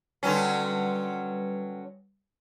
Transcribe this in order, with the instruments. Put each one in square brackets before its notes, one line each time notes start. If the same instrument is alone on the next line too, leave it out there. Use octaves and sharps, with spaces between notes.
[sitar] D3 F#3 C#4 [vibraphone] G3 B4